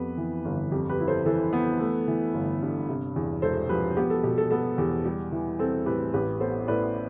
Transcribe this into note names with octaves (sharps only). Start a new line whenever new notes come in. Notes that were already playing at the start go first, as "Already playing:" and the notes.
Already playing: F2 B3 G4 B4
E3
G1
F2 G4
G4 B4
E4
A4 C5
E3 A4
B3
A3
E3
G1
G2
C3
E2
E1 A4 C5
F3 G4 B4
B3 G4
A4
B2 G4
A4
B3 A4
E2 G4
G3 G4
E3
C4 A4
A2 G4 B4
A1 G4 B4
B3 A4 C5
A2 B4 D5